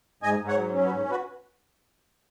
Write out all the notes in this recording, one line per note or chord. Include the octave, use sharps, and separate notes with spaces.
G#2 D#5 G#5
G#2
C#5 F#5
F#3
C#4
F#4 B4
G#2
F#4 B4